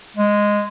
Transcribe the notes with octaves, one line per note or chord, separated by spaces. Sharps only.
G#3